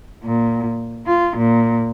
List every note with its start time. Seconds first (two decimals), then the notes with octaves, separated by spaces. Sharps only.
0.23 A#2
1.07 F4
1.35 A#2